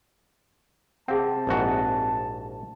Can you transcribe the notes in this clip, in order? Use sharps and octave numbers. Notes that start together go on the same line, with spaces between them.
C3 C4 G#4 F5 F#5 A5
A#1 G#2 F#4